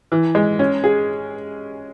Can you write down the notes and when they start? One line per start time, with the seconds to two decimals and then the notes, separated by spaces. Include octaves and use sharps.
0.12 E3
0.35 G#3
0.59 C#4
0.84 G#4